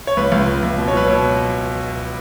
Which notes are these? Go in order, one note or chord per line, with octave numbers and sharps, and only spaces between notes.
C#5
C#2 B4
C#2
C#2
C#2
B2
C#5
F#3 B4
B2 C#5